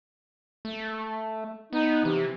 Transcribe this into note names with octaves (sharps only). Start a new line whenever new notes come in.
A3
B3 D#4
C3 E3